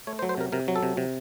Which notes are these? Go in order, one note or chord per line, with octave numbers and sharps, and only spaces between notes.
A3 C#5
C5
F#3
C5
C3 A#4
C3 A#4
F#3
A4
C3
C3